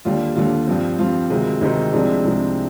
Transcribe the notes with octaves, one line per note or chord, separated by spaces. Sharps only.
D#2 D3 G3 F4
D#2 D3 G3 F4
G2 F3 C4
G2 F3 C4 F4
D2 C3 D#3 G#3 C4
D2 C3 D#3 G#3 C4 D#4
C2 C3 F3 G#3 C4 D4
C2 C3 F3 G#3 C4